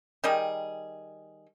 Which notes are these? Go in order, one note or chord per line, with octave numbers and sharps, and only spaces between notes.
D#3 G3 G#4